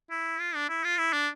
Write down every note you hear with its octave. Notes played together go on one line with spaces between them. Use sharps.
E4
F4
D4
E4
F4
E4
D4